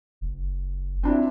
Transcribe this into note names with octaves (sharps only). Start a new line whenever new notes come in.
F#1
C4 D4 E4